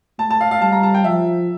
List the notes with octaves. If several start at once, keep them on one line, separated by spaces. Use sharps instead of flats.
A3 A5
A5
F5
F5
G3 A5
A#5
A5
G5
F3 E5